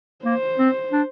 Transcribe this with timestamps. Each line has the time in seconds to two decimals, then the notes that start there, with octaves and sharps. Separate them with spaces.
0.25 A#3 C5
0.59 C4
0.92 D4